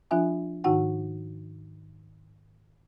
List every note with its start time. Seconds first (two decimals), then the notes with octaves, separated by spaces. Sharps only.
0.11 F3 D4 F4 E5 G#5
0.64 G#2 D#3 D#4 F#4 F#5 G5